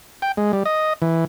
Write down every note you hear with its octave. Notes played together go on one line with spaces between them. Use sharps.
G5
G#3
G3
D#5
E3